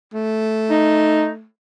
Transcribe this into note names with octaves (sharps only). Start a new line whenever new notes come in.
A3
D#4